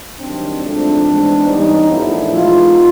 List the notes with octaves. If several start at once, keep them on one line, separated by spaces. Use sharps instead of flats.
C2 C3 D#3 F#3 C4 D4
G#2 F3 A3 C4 D4
G#2 E3 G#3 B3
G2 E3 G3 B3 C#4 D#4
A#1 A#2 F3 A3 D4 E4
G#2 E3 G#3 B3 D#4 F4